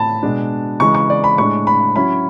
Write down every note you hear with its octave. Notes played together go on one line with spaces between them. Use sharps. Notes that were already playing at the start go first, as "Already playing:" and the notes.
Already playing: A2 A5 B5
B2 G#3 D4
C#3 E3 G#3 C#6
C#6
D5
B5
A2 G#3 D4 C#6
B5
F#3 C#4 E4 B5